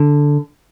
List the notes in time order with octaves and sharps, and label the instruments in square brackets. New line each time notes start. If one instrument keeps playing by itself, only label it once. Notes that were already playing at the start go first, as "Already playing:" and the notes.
Already playing: [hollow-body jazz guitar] D3